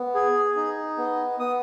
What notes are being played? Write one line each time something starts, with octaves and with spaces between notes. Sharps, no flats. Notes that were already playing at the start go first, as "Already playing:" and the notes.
Already playing: B3
G#4
D#4
B3
B3 D#6